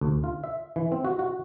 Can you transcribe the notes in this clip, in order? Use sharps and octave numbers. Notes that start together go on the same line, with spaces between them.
D2
F4
E5
E3
C4
F#4
F#4